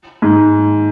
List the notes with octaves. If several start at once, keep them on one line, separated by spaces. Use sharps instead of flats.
G#2